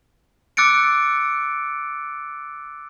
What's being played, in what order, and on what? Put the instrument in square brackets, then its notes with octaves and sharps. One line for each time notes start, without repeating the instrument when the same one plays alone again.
[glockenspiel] D6 E6 F#6 A6 C#7 D7